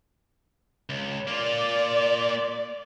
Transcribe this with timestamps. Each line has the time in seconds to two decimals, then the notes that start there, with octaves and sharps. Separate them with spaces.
0.89 C#2
1.28 A#3 F4 D5